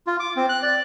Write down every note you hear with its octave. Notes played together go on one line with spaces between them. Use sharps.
F4
D6
C4
F#6
D5